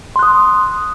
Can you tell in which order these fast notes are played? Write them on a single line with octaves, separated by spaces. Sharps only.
C6 F#6 D#6